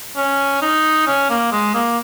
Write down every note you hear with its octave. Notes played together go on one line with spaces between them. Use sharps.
C#4
D#4
C#4
A#3
G#3
A#3